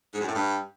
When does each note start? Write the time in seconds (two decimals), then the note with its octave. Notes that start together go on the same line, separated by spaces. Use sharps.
0.14 G#2
0.21 F#2
0.28 A2
0.35 G2